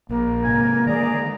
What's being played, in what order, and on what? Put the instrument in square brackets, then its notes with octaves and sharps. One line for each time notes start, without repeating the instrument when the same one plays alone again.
[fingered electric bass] A#1 [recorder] A#3
[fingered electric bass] G#2 C3 [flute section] A#4 [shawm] G#5
[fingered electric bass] D3 D#3 G#3 [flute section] G#4 D5 [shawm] A#5